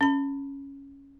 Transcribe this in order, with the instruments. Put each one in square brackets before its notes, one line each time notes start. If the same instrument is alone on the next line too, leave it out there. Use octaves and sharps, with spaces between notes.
[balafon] C#4 B5